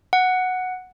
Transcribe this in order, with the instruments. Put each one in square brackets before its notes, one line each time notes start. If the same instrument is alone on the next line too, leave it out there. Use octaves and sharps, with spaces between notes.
[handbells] F#5